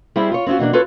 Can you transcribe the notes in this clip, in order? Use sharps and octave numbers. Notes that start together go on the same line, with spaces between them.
G3 C4 E4 G4 G#4
F4 C#5
C4 C#4 D#4 F4 F#4
B2 E3 A#3 D4
F4 A4 B4 C#5